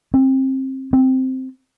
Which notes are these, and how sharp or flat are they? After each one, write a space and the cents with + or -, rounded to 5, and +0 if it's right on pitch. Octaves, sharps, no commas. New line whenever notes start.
C4 +25
C4 -5